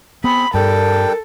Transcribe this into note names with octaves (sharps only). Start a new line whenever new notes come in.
B3 C4 G#4 B5
G2 G3 D4 A4 A#4 G5